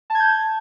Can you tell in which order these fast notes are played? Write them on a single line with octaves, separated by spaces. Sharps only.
A5 G#6 G6